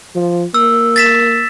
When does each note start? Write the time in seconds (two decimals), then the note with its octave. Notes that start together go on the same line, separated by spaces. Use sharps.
0.16 F3
0.54 A#3 E6
0.96 A6 B6 E7